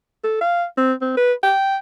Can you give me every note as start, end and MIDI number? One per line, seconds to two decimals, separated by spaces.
0.24 0.38 69
0.41 0.64 77
0.77 0.93 60
1.01 1.15 60
1.17 1.33 71
1.43 1.76 79